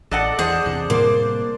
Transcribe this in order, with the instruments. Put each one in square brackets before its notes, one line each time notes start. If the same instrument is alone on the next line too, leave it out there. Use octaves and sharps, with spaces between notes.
[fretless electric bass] A1 [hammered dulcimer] D4 D5 [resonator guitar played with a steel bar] A4 D#5 F#5
[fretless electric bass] E2 [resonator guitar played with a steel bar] G#4 [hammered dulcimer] C5 [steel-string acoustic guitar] D#5 F#5
[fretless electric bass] E2 C3
[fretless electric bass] A2 C3 G3 [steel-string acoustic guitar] A#3 C5 [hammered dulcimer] C6 D6